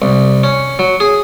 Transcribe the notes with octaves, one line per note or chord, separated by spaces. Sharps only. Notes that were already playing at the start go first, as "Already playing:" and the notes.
C2
C#4
F#3
G#4